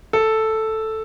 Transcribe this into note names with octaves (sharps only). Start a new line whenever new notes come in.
A4